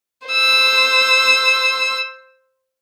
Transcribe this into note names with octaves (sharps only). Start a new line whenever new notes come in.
C5 E6